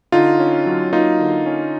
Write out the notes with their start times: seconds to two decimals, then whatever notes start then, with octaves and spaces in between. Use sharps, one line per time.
0.12 D3 D#4 F4
0.40 C#4
0.66 F#3
0.93 A#3 D#4 F4
1.20 D3
1.46 C#4